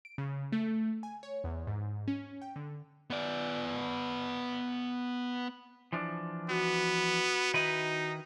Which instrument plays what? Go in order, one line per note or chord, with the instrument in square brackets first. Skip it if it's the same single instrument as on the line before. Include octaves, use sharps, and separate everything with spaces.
[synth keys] D7
C#3
A3
G#5
C#5
E2
G#2
C#4
G5
D3
[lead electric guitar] B3 D5
[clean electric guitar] E3 F3 D4
[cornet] B3 [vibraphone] F#4
[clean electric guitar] D#3 E4 B4 [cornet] D#4